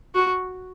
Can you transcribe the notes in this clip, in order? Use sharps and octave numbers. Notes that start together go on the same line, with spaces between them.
F#4